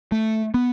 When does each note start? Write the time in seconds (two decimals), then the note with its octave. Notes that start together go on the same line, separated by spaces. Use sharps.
0.12 A3
0.54 B3